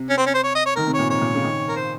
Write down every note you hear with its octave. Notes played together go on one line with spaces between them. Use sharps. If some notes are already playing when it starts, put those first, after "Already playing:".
Already playing: C3
C#4
C4
C#4
C5
C#5
D#5
C#5
D#3 A#4
C3
C#5
A#2
G#2 C#5
A#2
C#3
D#3
A#4
C5